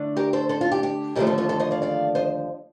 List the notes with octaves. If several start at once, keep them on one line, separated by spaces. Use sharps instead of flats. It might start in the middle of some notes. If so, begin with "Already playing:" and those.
Already playing: D3 A3 D4
G4 A#4
A4 C5
A4 C5
F4 A4
G4
G4
D#2 D3 F3 A3 G4 A#4
A4 C5
F4 A4
A4 C5
C5 D#5
D5 F5
D5 F5
C5 D#5